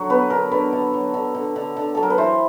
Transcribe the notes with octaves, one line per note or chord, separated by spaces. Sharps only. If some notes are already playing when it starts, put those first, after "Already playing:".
Already playing: D3 F#3 F#4
B3 B4
D3 A#4
D3 B4
D3
F#3
D3
D3
D3
D3
F#3 A4
A#4
B4
E3 C5